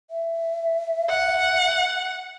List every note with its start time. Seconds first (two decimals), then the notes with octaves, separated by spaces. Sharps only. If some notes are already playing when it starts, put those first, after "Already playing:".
0.10 E5
1.09 F#5